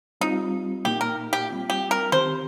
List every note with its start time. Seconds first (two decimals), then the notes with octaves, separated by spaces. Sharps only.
0.21 G3 C4 D#4 F4
0.84 A#2 A#3 D#4 G4
1.01 A#4
1.33 G4
1.49 G3 C4 F4
1.70 G4
1.91 A#4
2.12 D#3 C4 G4 C5